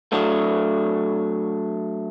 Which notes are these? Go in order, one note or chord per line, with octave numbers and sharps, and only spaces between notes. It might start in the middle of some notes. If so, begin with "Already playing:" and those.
F#3 A3 D4